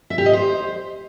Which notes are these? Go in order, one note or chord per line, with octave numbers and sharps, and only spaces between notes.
E5
G4
D#5
C5